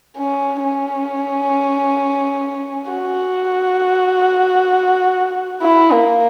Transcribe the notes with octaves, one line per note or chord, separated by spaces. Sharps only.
C#4
C#4
F#4
E4
A#3